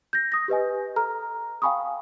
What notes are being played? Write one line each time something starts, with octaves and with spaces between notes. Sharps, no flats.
G6 A#6
D#6 A#6
G4 B4 D#5 G#5
A4 A#5 F6
F5 G5 G#5 B5 C#6 D#6